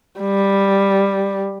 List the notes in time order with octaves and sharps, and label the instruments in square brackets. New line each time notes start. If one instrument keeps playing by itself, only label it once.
[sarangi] G3